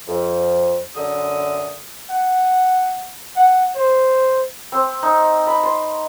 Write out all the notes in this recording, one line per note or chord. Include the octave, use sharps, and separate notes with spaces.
F2
F#2 D3 D#6
F#5
F#5
C5
C4
D#4
B5
C6